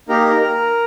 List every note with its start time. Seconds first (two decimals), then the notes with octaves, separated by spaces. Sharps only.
0.09 A#3 D#4 G4 A#4
0.41 A#4